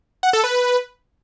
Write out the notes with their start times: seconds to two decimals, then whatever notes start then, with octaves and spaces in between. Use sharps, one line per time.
0.23 F#5
0.33 A4
0.44 B4